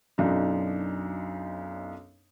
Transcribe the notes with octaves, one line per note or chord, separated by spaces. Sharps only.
B1 F#2 D4 D#4